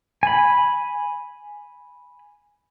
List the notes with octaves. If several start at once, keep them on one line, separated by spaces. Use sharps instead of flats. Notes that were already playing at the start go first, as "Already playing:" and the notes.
G#5 B5